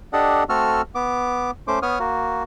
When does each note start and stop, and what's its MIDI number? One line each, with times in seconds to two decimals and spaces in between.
0.13 0.44 62
0.13 0.44 67
0.13 0.44 69
0.13 0.44 75
0.13 0.44 78
0.49 0.82 57
0.49 0.82 60
0.49 0.82 66
0.49 0.82 69
0.49 0.82 88
0.49 0.82 89
0.95 1.51 59
0.95 1.51 86
1.68 1.79 57
1.68 1.79 61
1.68 1.79 72
1.68 1.79 86
1.82 1.99 59
1.82 1.99 73
1.82 1.99 87
1.82 1.99 89
1.99 2.43 58
1.99 2.43 66